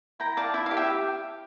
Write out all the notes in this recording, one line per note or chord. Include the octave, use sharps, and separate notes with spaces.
E4 G5 A#5
D5 F5 A5
E4 E5
F5
G4
E5 G5